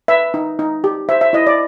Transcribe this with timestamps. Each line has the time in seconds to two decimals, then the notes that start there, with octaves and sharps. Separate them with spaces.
0.08 B4 E5
0.34 D#4
0.59 D#4
0.84 G4
1.09 C5 E5
1.21 E5
1.33 E4 D#5
1.47 D5